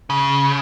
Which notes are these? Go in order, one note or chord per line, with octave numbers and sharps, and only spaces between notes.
C#3